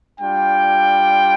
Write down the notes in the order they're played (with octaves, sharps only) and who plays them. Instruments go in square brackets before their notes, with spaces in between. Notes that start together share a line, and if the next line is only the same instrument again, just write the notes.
[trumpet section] G3 D4 F4 G5